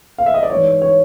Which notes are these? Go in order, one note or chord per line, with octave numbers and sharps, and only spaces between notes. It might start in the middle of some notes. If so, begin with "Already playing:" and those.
F5
E5
D#5
D5
G#2 E3 C#5
C#5